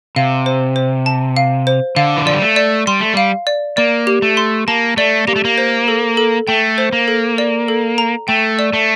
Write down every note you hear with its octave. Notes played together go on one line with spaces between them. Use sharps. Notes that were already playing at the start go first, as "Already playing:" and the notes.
C3 F5
C5
C5
A5
F5
C5
D3 F5
E3
F3 D5
G3
A3
D5
G3 C6
A3
G3 F5
D5
A#3 D5
G4
A3
C6
A#3 A5
A3 D5
A#3 G4
A3
A#3
C5
A4
A4
A3 G5
C5
A#3
A4
D5
A4
A#5
A3 G5
D5
A3